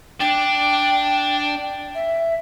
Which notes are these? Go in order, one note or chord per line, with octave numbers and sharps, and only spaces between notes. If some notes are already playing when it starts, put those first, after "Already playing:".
D4 G5
E5